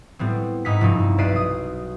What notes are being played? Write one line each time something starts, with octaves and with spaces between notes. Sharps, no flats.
A2 G3 B3 C4
G#2 D#4 E4 F#5 B6
F1 G2 D#4
B1 D5 E5 F#6 C7 D#7
D#6